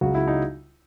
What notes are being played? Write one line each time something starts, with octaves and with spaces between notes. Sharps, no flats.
C#2 C#3 F#3 F#4
E4
D#4